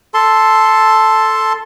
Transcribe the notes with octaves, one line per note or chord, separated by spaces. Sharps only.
A4 A5 C6